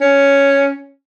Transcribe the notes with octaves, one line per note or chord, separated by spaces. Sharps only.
C#4